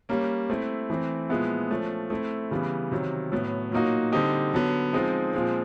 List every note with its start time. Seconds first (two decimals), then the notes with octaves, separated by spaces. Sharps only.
0.09 G3 A#3 C#4
0.50 A3 C4 E4
0.90 E3 A3 C4
1.29 A#2 F3 G#3 B3 E4
1.70 F3 A3 C#4
2.10 A3 C4 E4
2.51 C#3 E3 G3 B3
2.92 C3 D#3 F#3
3.32 A2 F#3 B3
3.72 A#2 F#3 A#3 D#4 F#4
4.12 D3 G3 C4 D#4 G4
4.54 D3 F#3 B3
4.93 F3 G#3 C4 D#4
5.33 A#2 F3 G#3 C4